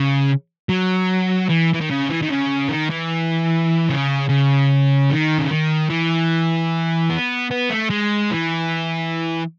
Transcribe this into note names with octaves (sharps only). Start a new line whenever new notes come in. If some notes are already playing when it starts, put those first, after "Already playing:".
Already playing: C#3
F#3
E3
E3
D#3
C#3
E3
D#3
C#3
D#3
E3
C#3
C#3
D#3
C#3
D#3
E3
B3
B3
A3
G#3
E3